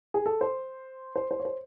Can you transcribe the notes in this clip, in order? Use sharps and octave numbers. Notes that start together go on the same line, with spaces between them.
G#4
A4
C5
C5
C5
C#5
C5